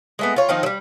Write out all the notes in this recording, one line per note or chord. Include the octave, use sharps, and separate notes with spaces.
G#3 A3 B3
F4 C#5
D#3 F3 C4 D#4
F#3 G3